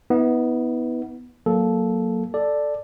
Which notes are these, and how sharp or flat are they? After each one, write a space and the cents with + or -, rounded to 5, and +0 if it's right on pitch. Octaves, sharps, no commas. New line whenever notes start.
B3 +0 E4 -45
F#3 +0 A#3 +0 A4 -15
A4 +0 D5 +5